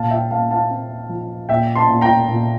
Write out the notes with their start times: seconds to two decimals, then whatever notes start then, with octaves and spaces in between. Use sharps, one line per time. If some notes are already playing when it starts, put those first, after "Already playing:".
Already playing: A#2 F5 A5
0.11 E5 G5
0.31 A#2 F5 A5
0.51 F5 A5
0.70 C4
1.09 F3
1.49 A#2 E5 G5
1.75 A5 C6
1.89 A#2
2.01 G5 A#5
2.28 A#2